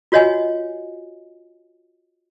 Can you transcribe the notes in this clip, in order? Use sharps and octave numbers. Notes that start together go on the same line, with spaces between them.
F4 F#4 C#5 D#5 G#5